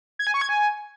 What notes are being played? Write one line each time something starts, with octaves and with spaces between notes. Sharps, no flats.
G#6
G#5
C#6
G#6
G#5